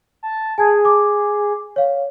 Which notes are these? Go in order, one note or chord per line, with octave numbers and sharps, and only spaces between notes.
A5
G#4 G#5 A5 G#6
D6
C#5 F5